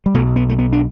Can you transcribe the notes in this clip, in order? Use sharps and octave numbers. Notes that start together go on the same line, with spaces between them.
G3
B1 B2 A3
B3
A3
B3
D4